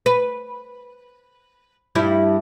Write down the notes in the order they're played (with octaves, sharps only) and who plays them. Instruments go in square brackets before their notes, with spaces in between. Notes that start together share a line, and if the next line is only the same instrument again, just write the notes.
[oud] B4
G2 G3 E4